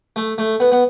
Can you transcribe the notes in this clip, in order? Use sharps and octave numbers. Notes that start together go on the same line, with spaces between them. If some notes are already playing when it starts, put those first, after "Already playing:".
A3
A3
B3
B3